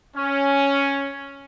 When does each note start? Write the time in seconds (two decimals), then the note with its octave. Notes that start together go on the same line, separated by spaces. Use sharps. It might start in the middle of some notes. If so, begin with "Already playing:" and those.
0.16 C#4